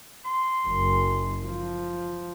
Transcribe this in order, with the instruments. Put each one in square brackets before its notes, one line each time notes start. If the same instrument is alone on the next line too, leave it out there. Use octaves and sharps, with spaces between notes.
[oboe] C6
[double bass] F#1
F3